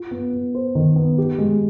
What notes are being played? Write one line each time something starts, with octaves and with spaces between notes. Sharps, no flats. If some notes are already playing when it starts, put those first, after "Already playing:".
Already playing: F4
B3
B3
C5
D#3
B3
G4
G#3